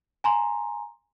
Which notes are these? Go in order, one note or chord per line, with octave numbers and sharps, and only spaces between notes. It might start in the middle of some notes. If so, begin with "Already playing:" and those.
G#5 A#5 C6